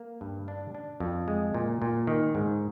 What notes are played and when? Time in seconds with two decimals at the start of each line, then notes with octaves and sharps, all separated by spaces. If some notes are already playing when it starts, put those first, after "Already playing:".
Already playing: A#3
0.21 G2
0.48 D4
0.75 D4
1.00 F2
1.28 G#3
1.54 A#2
1.82 A#2
2.07 D#3
2.35 G#2